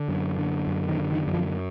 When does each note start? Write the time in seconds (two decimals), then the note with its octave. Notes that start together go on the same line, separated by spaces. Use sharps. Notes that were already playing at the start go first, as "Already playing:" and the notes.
Already playing: D3
0.09 F#2
0.38 D3
0.67 F#2
0.89 D#3
0.97 D3
1.12 D#3
1.27 F#2
1.34 F3